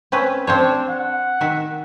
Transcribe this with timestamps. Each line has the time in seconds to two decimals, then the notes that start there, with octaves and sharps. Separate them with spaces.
0.12 C4 C#4 B4
0.47 C4 D4 C5 C#5
0.89 F#5
1.41 D#3 E5